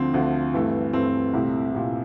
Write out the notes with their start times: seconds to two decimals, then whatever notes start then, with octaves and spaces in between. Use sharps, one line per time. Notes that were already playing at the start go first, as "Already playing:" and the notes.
Already playing: D2 D3 F3 C4
0.13 D2 D3 F3
0.54 G2 E3 A3
0.93 G2 E3 A3 C4
1.34 C2 A#2 A3 E4 G4
1.74 C2 A#2 A3 E4 G4